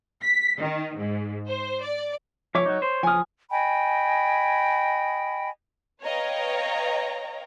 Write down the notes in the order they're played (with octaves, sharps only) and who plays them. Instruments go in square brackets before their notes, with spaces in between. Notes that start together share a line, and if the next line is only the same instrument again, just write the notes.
[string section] B6
D#3
G#2
C5
D5
[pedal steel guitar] F3 E5 D6 [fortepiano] C#5
[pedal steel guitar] F#3 D#4
C5
[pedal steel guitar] F3 D#6 [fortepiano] G#5 F6
[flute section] D#5 G5 G#5 B5
[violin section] B4 C#5 D#5 F5 G5 A#5